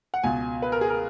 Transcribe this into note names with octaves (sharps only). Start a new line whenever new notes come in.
F#5
C#2 B2 G#5
B4
A#4
G#4
A#4